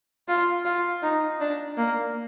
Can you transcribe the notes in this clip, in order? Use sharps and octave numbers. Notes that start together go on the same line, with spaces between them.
F4
F4
D#4
D4
A#3